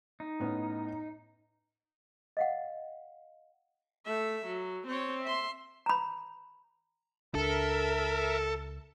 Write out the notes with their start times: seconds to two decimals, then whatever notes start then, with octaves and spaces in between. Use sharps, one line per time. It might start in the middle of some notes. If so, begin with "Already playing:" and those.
0.20 D#4
0.40 A2 B3 C#4
2.37 D#5 F5 F#5
4.05 A3 E5
4.46 F#3
4.87 C4 C#5
5.23 E5 C6
5.86 A#5 B5
7.35 C#2 D4 A4 A#4 E5